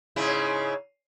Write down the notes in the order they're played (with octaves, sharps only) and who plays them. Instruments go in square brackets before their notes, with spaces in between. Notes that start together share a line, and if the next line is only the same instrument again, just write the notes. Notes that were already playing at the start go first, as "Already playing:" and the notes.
[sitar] G#2 C#3 E4